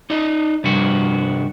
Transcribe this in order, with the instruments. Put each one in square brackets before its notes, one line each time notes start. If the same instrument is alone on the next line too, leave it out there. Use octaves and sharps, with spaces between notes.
[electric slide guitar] D#4 D5 D#5
[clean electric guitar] G2 F#4 [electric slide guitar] C3 F3 G3